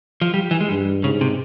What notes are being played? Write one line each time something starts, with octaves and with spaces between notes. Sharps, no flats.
F3
G3
E3
G#3
G2 G3
G#2 C#3
C3